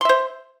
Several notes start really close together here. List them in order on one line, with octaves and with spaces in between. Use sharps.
C6 E5 C5